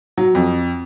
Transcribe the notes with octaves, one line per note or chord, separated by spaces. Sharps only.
F#3
F2